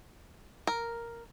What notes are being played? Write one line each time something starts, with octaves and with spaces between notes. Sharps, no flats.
A#4